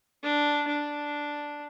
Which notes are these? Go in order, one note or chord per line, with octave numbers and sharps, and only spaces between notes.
D4
D4